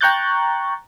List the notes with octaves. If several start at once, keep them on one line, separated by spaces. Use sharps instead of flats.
G5 A#5 C#6 F#6 G6 A6